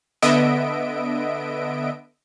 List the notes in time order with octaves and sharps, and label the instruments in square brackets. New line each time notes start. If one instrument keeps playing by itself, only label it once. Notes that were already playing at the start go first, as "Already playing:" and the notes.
[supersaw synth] D3 B3 D#5 E5 D7